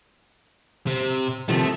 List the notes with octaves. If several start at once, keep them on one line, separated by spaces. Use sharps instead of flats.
C3
C3 D#3 F3 A3